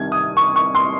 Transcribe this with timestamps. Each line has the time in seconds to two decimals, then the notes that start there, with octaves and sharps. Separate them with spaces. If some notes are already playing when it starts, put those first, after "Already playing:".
Already playing: C2 C3 D#3 G#6
0.12 D#6
0.37 C#6
0.56 C#6
0.75 C6